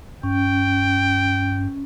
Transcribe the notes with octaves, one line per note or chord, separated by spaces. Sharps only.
G2 C#4 G5